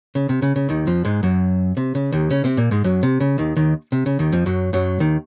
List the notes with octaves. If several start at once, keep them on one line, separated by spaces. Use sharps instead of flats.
C#3
C3
C#3
C#3
D#2 D#3
F2 F3
G#2 G#3
F#2 F#3
C3
C#3
D#2 D#3
C#3 C#4
C3 C4
A#2 A#3
G#2 G#3
F#2 F#3
C3
C#3
D#2 D#3
D#2 D#3
C3
C#3
D#2 D#3
F2 F3
F#2 F#3
F#2 F#3
D#2 D#3